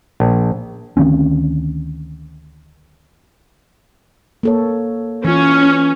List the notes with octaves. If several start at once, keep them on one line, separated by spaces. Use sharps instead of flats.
A#1
D2 D#3 C4 C#4
A#3 A4 C#5
E3 C#4 F4